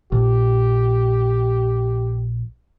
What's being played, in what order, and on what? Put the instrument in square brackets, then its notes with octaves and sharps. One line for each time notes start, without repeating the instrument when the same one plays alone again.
[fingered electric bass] A#1 [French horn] G4